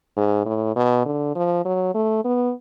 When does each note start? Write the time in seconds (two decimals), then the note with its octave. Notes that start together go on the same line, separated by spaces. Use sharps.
0.17 G#2
0.46 A2
0.76 B2
1.05 D3
1.35 F3
1.65 F#3
1.94 A3
2.25 B3